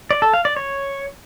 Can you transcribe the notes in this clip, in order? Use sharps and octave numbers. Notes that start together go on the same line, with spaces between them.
D5
A4
F5
D5
C#5